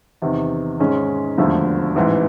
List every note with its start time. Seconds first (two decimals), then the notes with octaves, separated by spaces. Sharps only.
0.22 E2 C3 D#3
0.80 G#2 D#3 G#3 C#4
1.38 E1 D#2 D3 F3 A3
1.96 A1 G#2 E3